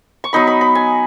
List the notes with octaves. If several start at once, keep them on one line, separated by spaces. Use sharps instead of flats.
C#6
F#3 B3 D#4 B5
B5
B5
G#5